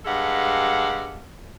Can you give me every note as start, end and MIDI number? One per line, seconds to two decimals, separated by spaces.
0.05 1.25 43
0.05 1.25 56
0.05 1.25 67
0.05 1.25 69
0.05 1.25 77
0.05 1.25 78